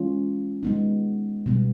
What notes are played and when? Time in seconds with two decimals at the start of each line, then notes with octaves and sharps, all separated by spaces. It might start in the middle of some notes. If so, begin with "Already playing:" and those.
Already playing: E3 G#3 C#4 F4
0.63 G#3 B3 D#4
1.46 B2 G3 B3